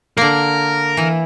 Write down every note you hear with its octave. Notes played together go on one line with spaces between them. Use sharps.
D3 A#3 A#4
E3 E4